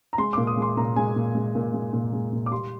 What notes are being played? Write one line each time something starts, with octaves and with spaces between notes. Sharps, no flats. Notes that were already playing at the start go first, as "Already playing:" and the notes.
A#5
G#3 C6
A#2 D6
D#6
G#3 C6
A#2 A#5
G#3 G#5
A#2
G#3
A#2
G#3
A#2
G#3
A#2
D6
G3 C6